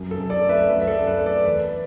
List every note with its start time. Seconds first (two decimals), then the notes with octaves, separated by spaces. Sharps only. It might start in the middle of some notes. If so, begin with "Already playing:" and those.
Already playing: F#2
0.11 A4
0.17 F#2
0.30 A4 D5
0.43 A3
0.49 B4 E5
0.68 F#2 B4 E5
0.81 E5
0.87 A4 D5
0.94 F#2
1.07 B4
1.20 A3
1.26 A4 D5
1.45 E2 B4